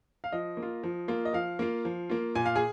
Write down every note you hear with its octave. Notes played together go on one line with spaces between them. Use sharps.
F5
F3 D#5
A#3
F4
F3
A#3 F4
D#5
F3 F5
A#3 F4
F3
A#3 F4
A#2 G#5
F5
G#4 G#5